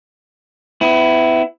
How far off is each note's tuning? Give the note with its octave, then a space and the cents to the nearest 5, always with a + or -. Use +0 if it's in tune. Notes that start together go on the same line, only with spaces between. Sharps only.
B3 +40 E4 +0